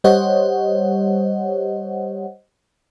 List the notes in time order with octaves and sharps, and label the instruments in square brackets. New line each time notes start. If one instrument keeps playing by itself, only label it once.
[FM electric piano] G3 G4 C5 C#5 D#5 F#5